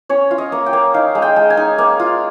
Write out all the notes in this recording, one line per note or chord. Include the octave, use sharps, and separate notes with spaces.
C#4 C#5
F4
D#5
A#3
G5
A#3
D#4 F5
G#3
G5
G#3
G#5
D#4
A#3
F4